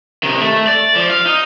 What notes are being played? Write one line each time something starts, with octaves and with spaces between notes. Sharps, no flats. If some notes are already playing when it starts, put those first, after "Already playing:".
C3 D#3
A3
D5
F3
F5
D#4